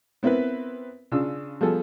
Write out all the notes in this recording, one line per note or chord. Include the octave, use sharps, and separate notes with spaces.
B3 C4 E4 A#4 B4
C#3 D4 F4 E6
F3 G3 B3 G#4 A4